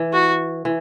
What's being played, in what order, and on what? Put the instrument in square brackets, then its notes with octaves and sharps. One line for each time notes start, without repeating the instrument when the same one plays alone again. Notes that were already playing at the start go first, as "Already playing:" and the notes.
Already playing: [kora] E3
[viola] F#4
[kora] E3